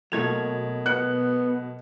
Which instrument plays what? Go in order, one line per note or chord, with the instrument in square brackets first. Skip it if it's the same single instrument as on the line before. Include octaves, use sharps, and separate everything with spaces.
[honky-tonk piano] B2 G#6 F7 [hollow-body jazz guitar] F#3 A3 A#3
[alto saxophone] B3 [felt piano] F#6 C#7